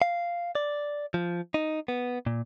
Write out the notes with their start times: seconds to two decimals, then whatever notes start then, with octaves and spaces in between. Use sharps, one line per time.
0.02 F5
0.55 D5
1.14 F3
1.54 D#4
1.88 B3
2.26 A#2